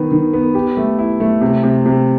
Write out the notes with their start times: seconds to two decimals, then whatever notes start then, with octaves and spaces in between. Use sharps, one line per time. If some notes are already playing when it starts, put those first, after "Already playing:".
Already playing: D#3 B3
0.12 D#3
0.33 B3
0.55 G4
0.77 A3
0.99 E4
1.20 A3
1.41 C3
1.64 C3
1.86 C3